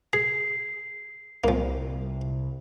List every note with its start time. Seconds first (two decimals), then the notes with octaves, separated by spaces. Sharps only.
0.13 G#4 C7
1.44 C2 F3 A#3